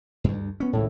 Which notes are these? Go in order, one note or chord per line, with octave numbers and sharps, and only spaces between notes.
D2 G2
B3 C#4
G#1 C#2 A2